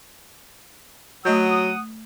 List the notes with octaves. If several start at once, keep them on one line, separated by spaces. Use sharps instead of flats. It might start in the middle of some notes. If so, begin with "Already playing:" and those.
F#3 A3 D#5 F#5 D#6 G6